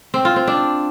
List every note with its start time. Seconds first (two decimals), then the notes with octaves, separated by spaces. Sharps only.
0.14 C4
0.25 F4
0.36 C4
0.47 D4